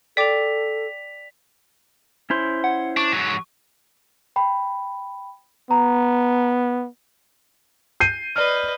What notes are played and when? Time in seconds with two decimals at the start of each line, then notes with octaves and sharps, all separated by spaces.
0.17 A4 D5 G5 D6 B6 F7
2.30 C#4 E4 C5
2.64 F#5
2.97 D4 C#6
3.12 G#2 F#3
4.36 G5 B5
5.71 B3 A#5
8.00 G6 C7 D#7
8.36 B4 D5 D#5 F6